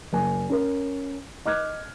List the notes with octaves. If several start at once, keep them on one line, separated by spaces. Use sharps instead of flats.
F#1 G#5
C#4 A#4
D#5 D6 F6 F#6 G#6